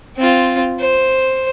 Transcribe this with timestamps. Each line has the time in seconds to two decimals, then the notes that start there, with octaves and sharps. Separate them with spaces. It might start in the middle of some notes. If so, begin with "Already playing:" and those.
0.18 C4 F4
0.79 C5